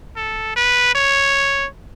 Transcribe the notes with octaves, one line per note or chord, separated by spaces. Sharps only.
A4
B4
C#5